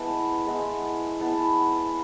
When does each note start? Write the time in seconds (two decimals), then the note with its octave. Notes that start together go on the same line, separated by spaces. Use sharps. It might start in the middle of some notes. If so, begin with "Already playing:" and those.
Already playing: G#3 B3 E4 A5
0.47 G#3 B3 E4
1.20 G#3 B3 E4 A5